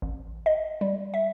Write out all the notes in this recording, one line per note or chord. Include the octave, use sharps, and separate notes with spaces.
A1
D#5
G3
E5